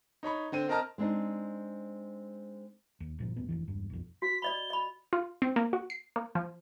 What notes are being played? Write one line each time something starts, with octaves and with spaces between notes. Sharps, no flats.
D#4 C#5 B5 C#6
D3 C4 D#7
C4 A#4 D#5 A5 A#5 F6
G#3 C4 D4 D#4
D#2
G1 A#2 F3
D#1 A1 B3
F1 D#2 E3
E1 G2
B1 F2
F#4 B6
D5 D#5 B5 G7
D#5 B5
F4
C4
A#3
F#4
C7
A#3
F3